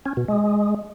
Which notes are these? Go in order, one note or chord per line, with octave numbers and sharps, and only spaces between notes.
C#4
B2
G#3